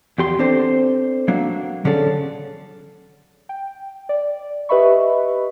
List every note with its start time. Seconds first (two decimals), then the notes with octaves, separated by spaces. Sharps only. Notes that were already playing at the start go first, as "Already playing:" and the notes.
0.18 E2 G4 C6
0.39 C4 D4 A4 C5
1.28 F#3 A#3 D4
1.85 D3 C#4 G#4 A4
3.49 G5
4.09 D5
4.69 G4 B4 D#5 E5 B5 C#6